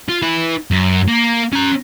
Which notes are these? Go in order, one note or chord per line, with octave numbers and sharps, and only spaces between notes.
F4
E4 B4
F#2
A#3
C#4 A#5